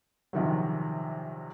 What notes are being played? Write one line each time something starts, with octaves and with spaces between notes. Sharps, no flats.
A#1 C3 D#3 F#3